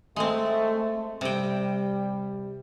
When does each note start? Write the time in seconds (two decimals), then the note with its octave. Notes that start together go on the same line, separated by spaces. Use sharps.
0.16 G#3 A3 C4
1.21 C3 G3 G5